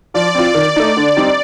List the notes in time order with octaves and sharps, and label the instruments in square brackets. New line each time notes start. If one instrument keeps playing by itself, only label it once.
[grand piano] F3 [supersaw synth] D5
[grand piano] C4 F4
D#3
A3 D#4
D3
G3 C4 D#4